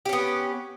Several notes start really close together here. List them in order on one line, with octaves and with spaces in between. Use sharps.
G4 C#4 B3